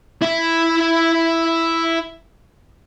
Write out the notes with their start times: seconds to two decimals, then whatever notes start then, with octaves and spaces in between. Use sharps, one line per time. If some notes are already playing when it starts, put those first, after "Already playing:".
0.22 E4 E5